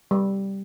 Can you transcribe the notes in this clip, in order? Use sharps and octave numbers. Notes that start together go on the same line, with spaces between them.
G3